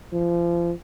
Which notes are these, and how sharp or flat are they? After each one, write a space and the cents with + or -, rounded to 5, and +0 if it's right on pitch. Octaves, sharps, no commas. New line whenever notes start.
F3 -30